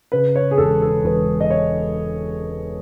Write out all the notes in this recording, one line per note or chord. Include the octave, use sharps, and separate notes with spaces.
C#3 B4
C#5
G#4
E1 A4
A4
E1 B4
D#5
C#5